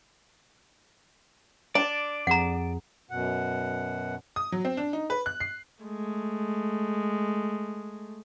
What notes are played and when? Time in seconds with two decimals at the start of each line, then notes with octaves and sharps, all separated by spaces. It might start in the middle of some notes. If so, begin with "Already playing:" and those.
1.75 D4 D5
2.27 F2 G#4 F#5 A#5
3.11 F#2 B2 F#5
4.36 D#6
4.52 F#3
4.65 C4
4.77 D4
4.93 D#4
5.10 B4
5.26 F#6
5.40 C7
5.83 G#3 A3